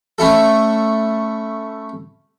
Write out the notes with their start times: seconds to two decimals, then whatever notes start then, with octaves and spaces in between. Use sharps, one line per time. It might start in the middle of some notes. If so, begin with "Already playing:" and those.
0.18 A3 C#4 E4 A4